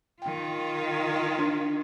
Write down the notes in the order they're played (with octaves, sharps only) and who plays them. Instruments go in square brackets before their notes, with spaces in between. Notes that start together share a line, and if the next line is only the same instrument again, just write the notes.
[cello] D#3 F4 [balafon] G5
[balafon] D4